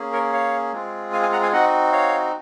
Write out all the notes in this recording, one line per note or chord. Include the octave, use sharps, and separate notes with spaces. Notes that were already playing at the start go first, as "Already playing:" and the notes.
Already playing: A#3 C#4 G#4
A#4 C#5
C#5 F5
G#3 C4 F4 G#4
F5 G#5
F5 G#5
F#5 A#5
F5 G#5
C4 D#4 F#4 D#5 F#5
C#5 F5